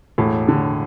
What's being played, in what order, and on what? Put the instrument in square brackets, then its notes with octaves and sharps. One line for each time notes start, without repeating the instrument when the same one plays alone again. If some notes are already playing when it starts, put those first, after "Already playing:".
[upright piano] E1 [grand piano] A2
[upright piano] D3